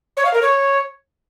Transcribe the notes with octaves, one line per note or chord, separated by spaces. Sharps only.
C#5
F5
A#4
C#5